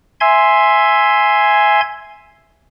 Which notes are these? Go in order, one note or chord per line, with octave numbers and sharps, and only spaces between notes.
E5 G#5 C6 G#6